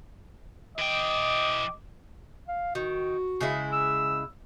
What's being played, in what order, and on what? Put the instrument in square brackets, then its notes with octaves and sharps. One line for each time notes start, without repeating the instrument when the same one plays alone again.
[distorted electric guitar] E3 G5 [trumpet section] D#5 D6
[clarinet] F5
[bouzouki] D#3 [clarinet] F#4
[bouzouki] C#3 G#3 E4
[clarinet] E6